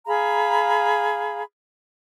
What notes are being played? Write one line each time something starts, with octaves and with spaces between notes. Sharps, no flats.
G#4 F5 A#5 B5